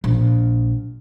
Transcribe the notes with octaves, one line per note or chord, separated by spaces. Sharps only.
A#1